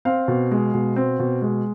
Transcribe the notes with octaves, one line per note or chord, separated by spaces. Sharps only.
C4 F5
B2
G#3
B2
C4
B2
G#3